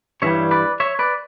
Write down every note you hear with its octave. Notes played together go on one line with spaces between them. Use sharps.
G2 E3 G3 C#5 E5
B4 D5
C#5 E5
B4 D5